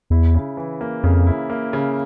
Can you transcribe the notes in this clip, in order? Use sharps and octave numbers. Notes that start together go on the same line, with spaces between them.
E2 E4
C#3
E3
A#3
F2 C#3
E4
A#3
C#3